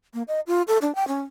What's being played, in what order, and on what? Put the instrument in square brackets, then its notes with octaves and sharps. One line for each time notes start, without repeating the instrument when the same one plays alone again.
[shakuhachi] A#3
D#5
F4
A4
D4
G5
C#4